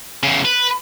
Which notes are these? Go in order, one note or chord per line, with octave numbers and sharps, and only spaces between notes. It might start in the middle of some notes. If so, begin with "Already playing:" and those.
E2 C#3
B4